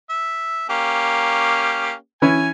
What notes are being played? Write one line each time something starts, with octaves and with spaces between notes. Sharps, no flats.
E5
A#3 C#4 G4
E3 C#4 E4 G#5